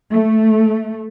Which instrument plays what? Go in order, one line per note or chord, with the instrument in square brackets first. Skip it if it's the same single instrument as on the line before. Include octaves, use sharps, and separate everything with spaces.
[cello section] A3